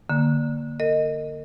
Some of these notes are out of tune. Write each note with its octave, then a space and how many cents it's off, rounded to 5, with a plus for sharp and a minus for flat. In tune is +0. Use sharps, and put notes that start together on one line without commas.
D3 +0 A#3 +0
A#4 -35 D#5 +0